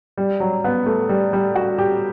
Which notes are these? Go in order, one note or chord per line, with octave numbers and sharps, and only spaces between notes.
G3
F#3
B3
A3
G3
G3
F#4
G4